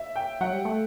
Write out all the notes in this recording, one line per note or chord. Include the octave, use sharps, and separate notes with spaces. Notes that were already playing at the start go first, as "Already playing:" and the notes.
Already playing: E5
G5
F#3 F#5
G3
A3